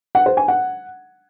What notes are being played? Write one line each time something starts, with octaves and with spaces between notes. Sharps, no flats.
F#5
C5
G#5
F#5